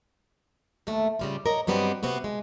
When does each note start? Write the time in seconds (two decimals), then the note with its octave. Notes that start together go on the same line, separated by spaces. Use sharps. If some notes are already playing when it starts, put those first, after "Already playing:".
0.87 D#2 D3 A3
1.19 C#3 G3 F4
1.46 A#4 C#5 D#5
1.67 G2 F#3 G3 B3 C4 D#5
2.03 C3 B3 C4 F#4
2.24 G#3